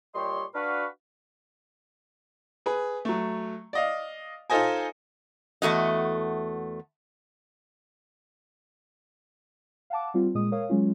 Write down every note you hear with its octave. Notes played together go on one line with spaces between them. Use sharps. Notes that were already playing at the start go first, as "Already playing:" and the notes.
A#2 G3 G4 C#5 D#5 C6
D4 F#4 B4 F5
G#4 B4
F#3 A3
D5 D#5 F5
D#4 F4 A4 C5 D#5 G#5
E2 A3 F#4 D#5
F5 F#5 A5 D6
G3 C4 F4
A#2 G#3 D#6
A#4 C#5 F5 D#6
F#3 G#3 C#4 F4